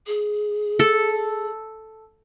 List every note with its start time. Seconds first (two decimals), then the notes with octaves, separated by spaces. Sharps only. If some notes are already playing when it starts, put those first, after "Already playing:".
0.07 G#4
0.79 A4